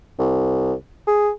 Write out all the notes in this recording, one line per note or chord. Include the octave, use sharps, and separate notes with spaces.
C2
G#4